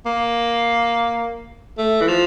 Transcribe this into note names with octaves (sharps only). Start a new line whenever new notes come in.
A#3
A3
E3
F3